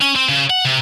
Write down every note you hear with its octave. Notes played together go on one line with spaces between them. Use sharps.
C#4
C4
C#3
F#5
C3